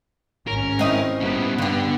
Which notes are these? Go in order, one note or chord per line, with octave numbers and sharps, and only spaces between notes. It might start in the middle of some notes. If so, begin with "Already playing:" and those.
G#1 C#4 A#4
C4 D#4 E4
G3 B3 C#4
G2 D3 G4